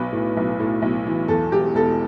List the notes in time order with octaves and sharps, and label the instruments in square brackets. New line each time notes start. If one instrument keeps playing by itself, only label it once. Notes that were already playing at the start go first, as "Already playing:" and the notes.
Already playing: [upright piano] B1 B4
A2
B1
A2
B1
E3
E2 A4
E1 G4
E1 A4